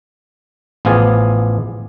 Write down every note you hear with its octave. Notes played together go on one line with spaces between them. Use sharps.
A1 F3 B3 F4 G#4 D5